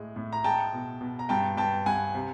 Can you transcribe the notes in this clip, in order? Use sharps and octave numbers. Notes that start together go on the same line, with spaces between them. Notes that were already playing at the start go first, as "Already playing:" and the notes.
Already playing: A2 G#3
A2
A#5
G#3 G5 A5
B2
B2
A#5
G2 G5 A5
G2 G5 A5
G2 F#5 G#5
C3